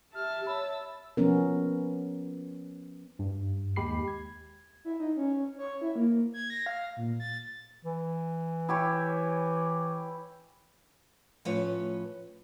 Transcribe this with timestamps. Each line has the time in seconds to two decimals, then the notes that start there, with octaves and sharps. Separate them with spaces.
0.15 G4 E5 A5 F6
0.47 C#5 B5 E6
1.17 F3 B3 C#4 A#4
3.19 G2
3.76 D#2 G#3 G4 B5 C7
4.08 G#6
4.85 E4
5.00 D#4
5.17 C#4
5.58 C#5
5.81 E4
5.96 A#3
6.34 G#6
6.50 A#6
6.66 F5
6.97 A#2
7.20 A6
7.85 E3
8.69 E4 G4 C#5
11.45 A2 F3 A3 C#4 B4 C#5